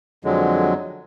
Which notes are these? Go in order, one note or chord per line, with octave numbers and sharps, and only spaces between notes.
F2 D3 F#3 G#3